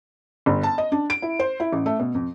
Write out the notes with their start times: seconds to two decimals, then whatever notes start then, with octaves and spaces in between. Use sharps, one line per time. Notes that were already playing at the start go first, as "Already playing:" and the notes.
0.46 G1
0.63 A5
0.78 D#5
0.92 D4
1.10 D7
1.22 E4
1.39 C5
1.60 E4
1.72 A1
1.86 A3
2.00 B2
2.14 F2